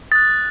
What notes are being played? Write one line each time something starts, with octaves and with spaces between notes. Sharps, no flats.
D#6 F#6 A6